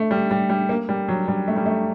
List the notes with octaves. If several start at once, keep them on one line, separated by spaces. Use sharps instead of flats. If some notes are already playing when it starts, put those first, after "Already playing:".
Already playing: A3
G3
G3
G3
A#3
G3
F#3
G3
A3
G3
A3